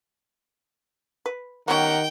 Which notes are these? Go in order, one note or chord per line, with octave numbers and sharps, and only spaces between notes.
B4
D#3 B3 C#4 G4 A#4 F#5 G5